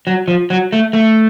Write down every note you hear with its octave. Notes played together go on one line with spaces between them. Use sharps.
F#3
F3
F#3
A3
A3